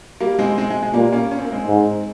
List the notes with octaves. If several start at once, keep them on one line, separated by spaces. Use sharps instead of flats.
G3 A#3
G#3 C4
G#3 C4
G#3
G#3
A#2 G3 A#3
A#3 C#4
C#4
C4
A#3
G#3 C4
G#2